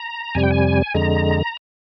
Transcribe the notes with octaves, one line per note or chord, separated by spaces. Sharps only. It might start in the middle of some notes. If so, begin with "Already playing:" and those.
Already playing: A#5
F2 C3 G3 G#5
G5
G#5
F2 D3 G#3 A#5